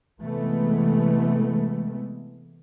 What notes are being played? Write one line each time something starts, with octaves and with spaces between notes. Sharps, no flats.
C3 E3 G#3 A3 B3